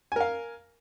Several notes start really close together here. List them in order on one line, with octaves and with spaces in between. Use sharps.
G#5 A#4 F5